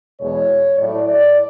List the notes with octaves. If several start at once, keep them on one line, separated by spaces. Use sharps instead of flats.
E2 B2 G#3 C#5
A2 F#3 A3 D5
D5